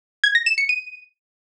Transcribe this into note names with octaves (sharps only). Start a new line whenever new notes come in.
G#6
A#6
E7
C#7
D#7